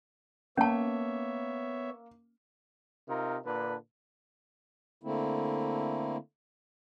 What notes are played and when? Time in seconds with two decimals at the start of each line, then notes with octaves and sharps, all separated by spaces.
0.58 A#3 B3 C#4 C#5 E5 A5
3.09 C3 D#4 F4 A#4
3.45 A#2 D3 D4 B4
5.03 D3 A3 A#3 C4 E4